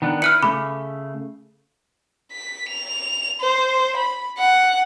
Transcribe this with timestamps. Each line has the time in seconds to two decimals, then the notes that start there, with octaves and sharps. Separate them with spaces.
0.02 D#3 B3 D4
0.22 E4 B4 F6 F#6 C#7
0.43 C#3 A3 B5 D6
2.31 B6
2.69 F7
3.41 C5
3.96 B5
4.38 F#5